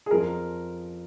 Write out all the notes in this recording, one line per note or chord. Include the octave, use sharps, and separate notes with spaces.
G#4
F2 F3 A#4